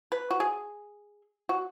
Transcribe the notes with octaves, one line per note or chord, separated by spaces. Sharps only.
B4
F#4
G#4
F#4